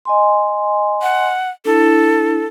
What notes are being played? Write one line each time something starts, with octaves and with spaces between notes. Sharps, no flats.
D#5 G#5 C6
F#5
D4 E4 A4